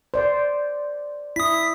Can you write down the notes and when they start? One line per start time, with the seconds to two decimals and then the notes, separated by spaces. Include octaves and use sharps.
0.14 C5 D5
1.36 E4 D#6 B6